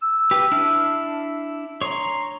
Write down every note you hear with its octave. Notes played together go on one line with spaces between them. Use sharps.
E6
G4 B4
D4 E4 F6
C#5 A#5 C6